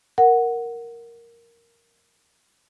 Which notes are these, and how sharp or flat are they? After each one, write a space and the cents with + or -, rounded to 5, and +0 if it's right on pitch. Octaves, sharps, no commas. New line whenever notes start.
A#4 +0 F#5 +0